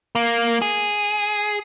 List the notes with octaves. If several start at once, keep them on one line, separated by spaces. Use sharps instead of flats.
A#3
G#4